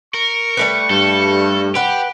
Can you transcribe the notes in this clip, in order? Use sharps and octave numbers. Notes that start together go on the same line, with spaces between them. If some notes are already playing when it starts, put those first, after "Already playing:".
A#4 C#6
G3 A3 B4
G2 A4
G4 B4 F#5